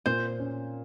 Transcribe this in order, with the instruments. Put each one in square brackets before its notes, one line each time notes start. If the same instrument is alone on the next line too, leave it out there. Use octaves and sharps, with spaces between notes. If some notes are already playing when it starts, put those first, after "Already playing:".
[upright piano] A#2 [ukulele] C5
[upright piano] C#4